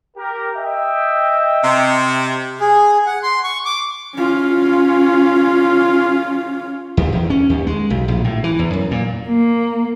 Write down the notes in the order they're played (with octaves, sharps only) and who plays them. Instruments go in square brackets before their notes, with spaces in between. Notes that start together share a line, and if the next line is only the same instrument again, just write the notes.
[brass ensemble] G4 A#4
D#5 E5 G5
[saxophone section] C3
[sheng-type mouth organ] G#4
F#5
C6
C#6
D6
[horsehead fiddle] C#4 F4
[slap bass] D#2
E2
C#4
D#2
G#3
B1
A#1
A2
E3
E2
F#2
A#2
[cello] A#3